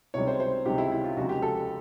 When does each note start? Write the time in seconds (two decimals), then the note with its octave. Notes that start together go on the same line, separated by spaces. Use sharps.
0.14 C#2 C3 D#3 G3 C#5
0.27 C5
0.40 C5
0.65 C#2 C3 D#3 G3 G4
0.78 E4
0.92 E4
1.04 F4
1.16 F1 D#2 C#3 F3 G#3 F#4
1.29 G4
1.42 A4